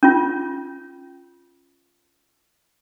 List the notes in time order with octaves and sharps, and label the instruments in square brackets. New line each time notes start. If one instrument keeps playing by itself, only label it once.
[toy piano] C#4 F4